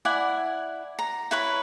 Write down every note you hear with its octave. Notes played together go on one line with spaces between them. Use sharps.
E4 D5 F#5 G#5
A#5
E4 B4 C#5 B5